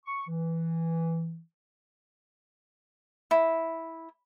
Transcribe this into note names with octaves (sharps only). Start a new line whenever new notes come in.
C#6
E3
E4